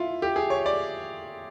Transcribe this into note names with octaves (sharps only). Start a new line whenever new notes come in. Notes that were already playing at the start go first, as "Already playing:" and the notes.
Already playing: E4 F4
G4
G#4
C#5
D5